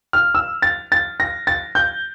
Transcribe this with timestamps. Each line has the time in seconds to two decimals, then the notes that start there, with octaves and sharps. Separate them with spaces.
0.13 F6
0.35 E6
0.62 A6
0.92 A6
1.20 A#6
1.47 A6
1.75 G6